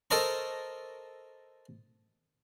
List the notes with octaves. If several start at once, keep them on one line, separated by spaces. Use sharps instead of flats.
A4 A#4 C5 D#5 A#5 C#6